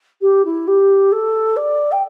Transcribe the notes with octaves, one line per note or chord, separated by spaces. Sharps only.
G4
E4
G4
A4
D5
G5